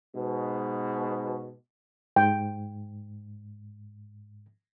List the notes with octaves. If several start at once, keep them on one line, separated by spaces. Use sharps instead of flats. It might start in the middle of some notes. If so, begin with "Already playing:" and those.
G#2 B2
G#2 G5